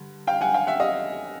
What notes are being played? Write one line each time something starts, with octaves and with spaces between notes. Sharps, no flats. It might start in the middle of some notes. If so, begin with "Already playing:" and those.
Already playing: G2 D3
F5 G5
F#5 G#5
F5 G5
E5 F#5
D#5 F5